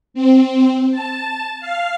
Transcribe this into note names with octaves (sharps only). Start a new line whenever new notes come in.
C4
A5
F5